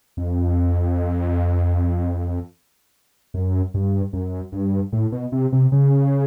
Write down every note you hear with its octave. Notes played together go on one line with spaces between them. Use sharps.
F2
F#2
G2
F#2
G2
A2
B2
C3
C3
C#3